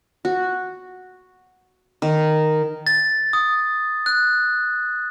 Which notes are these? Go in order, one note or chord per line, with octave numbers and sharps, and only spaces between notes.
F#4
D#3
A6
D#6
F#6